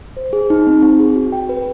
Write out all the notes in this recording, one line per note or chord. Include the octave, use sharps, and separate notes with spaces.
C5
G#4
D#4
C4
C4
G#4
F#4
G5
B4